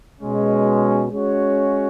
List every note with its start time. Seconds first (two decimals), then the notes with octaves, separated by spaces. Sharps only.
0.20 B2 G#3 C#4
1.10 G#3 C#4 F#4 C#5